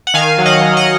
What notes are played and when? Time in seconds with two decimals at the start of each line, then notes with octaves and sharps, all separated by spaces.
0.07 F#5
0.14 D#3 F5 G#5
0.38 F#3
0.46 D#5 F#5
0.61 F#3
0.77 D#5 F#5